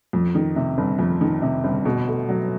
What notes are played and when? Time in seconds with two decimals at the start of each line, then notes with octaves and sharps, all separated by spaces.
0.13 F2
0.35 D#3
0.56 C3
0.78 G1
0.99 F2
1.21 D#3
1.42 C3
1.64 G1
1.85 B2
2.07 A3
2.29 F#3